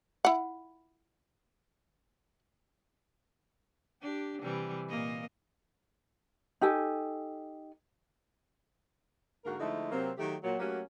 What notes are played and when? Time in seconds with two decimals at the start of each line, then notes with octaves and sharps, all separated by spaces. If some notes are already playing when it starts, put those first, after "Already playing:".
0.25 E4 F#5
4.02 D4 G4
4.42 C3 E3 G3
4.89 A#2 A#3 D#5
6.61 D#4 G4 A4 G#5
9.44 G#2 D3 A#3 F#4 A#4
9.58 D3 F3 G#3 A3 D#4 E4
9.91 C3 F#3 A#3 C4
10.18 D#3 F#3 A3 G4
10.43 A#2 F#3
10.59 F#3 A3 A#3 C#4 F#4 G4